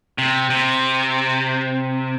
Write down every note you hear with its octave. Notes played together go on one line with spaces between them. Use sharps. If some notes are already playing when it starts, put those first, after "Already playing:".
C3
C3